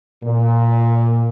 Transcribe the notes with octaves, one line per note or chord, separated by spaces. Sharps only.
A#2